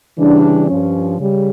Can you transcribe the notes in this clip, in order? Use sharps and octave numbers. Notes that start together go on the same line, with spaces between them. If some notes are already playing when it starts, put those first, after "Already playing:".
C#3 E3 G3 D4
G2 F3 C#4
C#3 G3